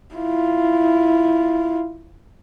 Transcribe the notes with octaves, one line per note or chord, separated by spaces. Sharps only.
E4 F4